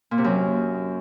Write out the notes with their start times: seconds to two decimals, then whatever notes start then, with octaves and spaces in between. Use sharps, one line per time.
0.11 A#2
0.18 C3
0.24 F#2